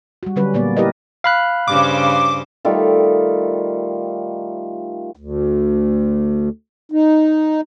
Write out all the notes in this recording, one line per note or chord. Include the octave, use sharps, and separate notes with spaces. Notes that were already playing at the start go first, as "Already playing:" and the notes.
G3 F#4
D3 F#3 G3 C#4 B4
A#2 A#3 B3 D5
E4 G4 A#4 B4 D5 D#5
F5 B5 F#6
G2 C#3 C5 D6
D#3 G3 A3 F4
D2
D#4